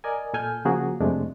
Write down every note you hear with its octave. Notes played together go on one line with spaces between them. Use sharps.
A#4 D5 D#5 G#5
A#2 A4 G#5 F6 G6
C#3 F3 A#3 F#4 G#4 A#4
F2 C3 G#3 A3 D4